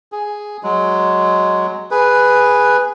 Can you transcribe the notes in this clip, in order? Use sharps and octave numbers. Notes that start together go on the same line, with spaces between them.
G#4
F#3 G#3
G#4 B4